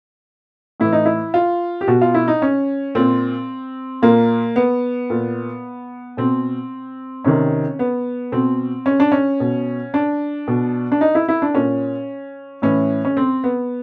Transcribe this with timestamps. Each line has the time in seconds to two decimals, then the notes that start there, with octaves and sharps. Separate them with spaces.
0.80 A2 E3 E4
0.93 D#4
1.05 E4
1.34 F4
1.81 G4
1.88 B2 F#4
2.01 F4
2.14 E4
2.28 D#4
2.42 C#4
2.95 A#2 C4
4.02 A#2 A#3
4.56 B3
5.10 A#2
6.17 B2 C4
7.24 C3 D#3 C#4
7.79 B3
8.32 B2 C4
8.86 C#4
9.00 D4
9.12 C#4
9.40 B2
9.94 D4
10.47 B2
10.92 D4
11.01 D#4
11.15 E4
11.29 E4
11.42 D4
11.54 A#2 C#4
12.62 A2 E3 C#4
13.05 C#4
13.17 C4
13.44 B3